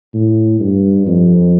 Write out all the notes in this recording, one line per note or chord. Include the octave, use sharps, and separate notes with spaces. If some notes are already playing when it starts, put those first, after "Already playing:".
A2
G2
F2